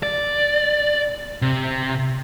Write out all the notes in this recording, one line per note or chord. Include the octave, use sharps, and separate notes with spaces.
D5
C3